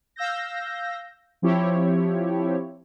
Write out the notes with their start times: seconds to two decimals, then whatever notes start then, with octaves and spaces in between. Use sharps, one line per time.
0.16 F5 E6 G6 A#6
1.42 F3 C4 E4 G4 C#5